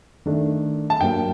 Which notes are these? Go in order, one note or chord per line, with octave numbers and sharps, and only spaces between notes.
D#3 A3 D4
A5
G2 F#3 A#3 G5